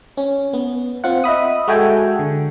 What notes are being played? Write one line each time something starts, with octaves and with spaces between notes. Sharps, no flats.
C#4
B3
C4 F4 F#5
D#5 E5 B5 D#6
G#3 F#4 A4 E5 G5 G#5
D3